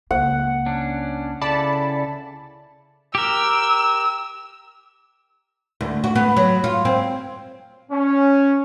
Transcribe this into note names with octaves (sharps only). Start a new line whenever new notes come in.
C#2 A#3 F#5
C#4 D4
C#3 E4 A4 D5 A5 B5
G4 A#4 E6
D2
F#4
B3
F#3
F4
C4
C#4